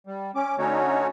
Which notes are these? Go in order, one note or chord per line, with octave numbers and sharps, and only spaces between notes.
G3
C#4 D6
D3 A3 C#4 D#4 F#4 C#5